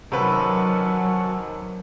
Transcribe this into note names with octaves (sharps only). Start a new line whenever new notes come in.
C3 D#3 F#3 C#4 F#4 A4 B4